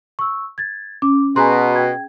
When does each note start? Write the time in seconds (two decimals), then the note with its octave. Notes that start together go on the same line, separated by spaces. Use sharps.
0.19 C#6 E6
0.58 G#6 A6
1.02 C#4 D6
1.36 B2 G#4 G#5 A#5 C6
1.75 G5 G#6